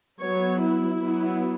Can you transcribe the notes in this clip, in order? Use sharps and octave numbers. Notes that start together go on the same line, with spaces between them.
F#3 B3 C#5
E4
F#3 B3